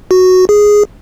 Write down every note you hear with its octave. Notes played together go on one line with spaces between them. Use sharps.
F#4
G#4